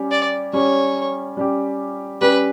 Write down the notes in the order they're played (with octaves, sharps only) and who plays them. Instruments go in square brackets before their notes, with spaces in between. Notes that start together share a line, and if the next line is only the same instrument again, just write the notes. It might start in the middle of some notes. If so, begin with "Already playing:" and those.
Already playing: [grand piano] G3 C#4 G4
[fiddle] D5
[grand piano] G3 C#4 G4 [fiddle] C#5
[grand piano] G3 C#4 G4
[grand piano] G3 C#4 G4 [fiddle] B4